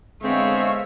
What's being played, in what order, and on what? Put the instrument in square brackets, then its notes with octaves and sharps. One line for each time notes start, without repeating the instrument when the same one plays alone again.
[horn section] D3 B3 C4 [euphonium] G#3 [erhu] C#5 [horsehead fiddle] E5 F5